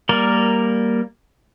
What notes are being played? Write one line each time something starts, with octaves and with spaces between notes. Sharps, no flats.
G3 A#3 A#4 D5